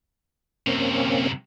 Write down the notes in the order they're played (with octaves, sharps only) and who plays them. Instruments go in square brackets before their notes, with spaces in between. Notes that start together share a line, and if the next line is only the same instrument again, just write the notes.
[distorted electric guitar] F#2 C3 [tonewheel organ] A#3 C4 C#4